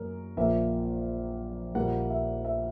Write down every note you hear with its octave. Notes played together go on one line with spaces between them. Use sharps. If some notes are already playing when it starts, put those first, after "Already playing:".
Already playing: F#2 A#3 A#4
A#1 A#2 A#3 E5
A#1 A#2 G3 A#3 F#5
E5
E5